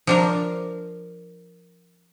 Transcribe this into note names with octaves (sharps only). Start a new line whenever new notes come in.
F3 D4 A#4